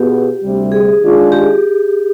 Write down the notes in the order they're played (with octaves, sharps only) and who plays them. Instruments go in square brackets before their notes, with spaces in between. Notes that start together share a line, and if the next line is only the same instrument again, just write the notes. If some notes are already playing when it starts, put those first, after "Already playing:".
Already playing: [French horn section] B2 B3 F4 G#4 [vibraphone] G4
[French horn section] D2 C3 G3
[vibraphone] G#4
[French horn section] D#3 G#3 D4 F4
[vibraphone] G4